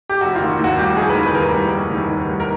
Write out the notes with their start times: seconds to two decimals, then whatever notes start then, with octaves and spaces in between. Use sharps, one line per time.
0.09 G4
0.21 F1 F#4
0.35 D#3 F4
0.49 F#4
0.59 D#2
0.64 F#4
0.78 G3 G4
0.96 F1 G#4
1.09 B4
1.15 D#3 A#4
1.27 B4
1.34 D#2 A#4
1.53 G3
1.72 F1
1.91 D#3
2.10 D#2
2.28 G3
2.40 A#4